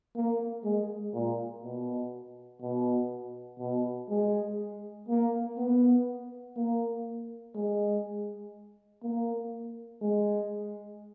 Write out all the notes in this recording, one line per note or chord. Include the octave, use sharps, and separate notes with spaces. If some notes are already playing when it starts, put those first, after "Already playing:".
A#3
G#3
A#2
B2
B2
B2
G#3
A#3
B3
A#3
G#3
A#3
G#3